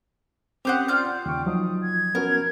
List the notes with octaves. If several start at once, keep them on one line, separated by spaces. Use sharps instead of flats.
C4 C#4 G4 C5 F#5 D#6
F4 D5 F6 G6
D#2 C#3 G5 C#6
F3 F#3 D#4 D#6
G#6
B3 C#4 F#4 A#4